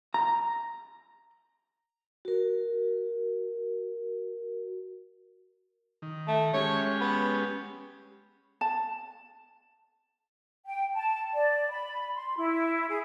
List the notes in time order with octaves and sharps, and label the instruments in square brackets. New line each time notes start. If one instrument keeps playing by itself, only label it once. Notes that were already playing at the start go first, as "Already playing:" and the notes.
[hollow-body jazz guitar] A#5
[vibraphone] F#4 A#4
[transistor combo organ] D#3
[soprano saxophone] A3
[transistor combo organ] G#3 C#4 G4 [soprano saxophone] C#5
[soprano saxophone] B3
[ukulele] A5
[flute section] G5
A5
D5
B5
C6
E4
G#4